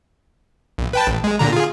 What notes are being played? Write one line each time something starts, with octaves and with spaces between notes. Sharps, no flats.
A#1
B4 G5 A5
A1
G#3
A#2 D3 A#5
F4 G#4